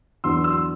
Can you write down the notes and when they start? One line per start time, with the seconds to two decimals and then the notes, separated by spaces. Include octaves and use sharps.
0.24 E2 D3 F#3 B3 C6 E6
0.44 C6 E6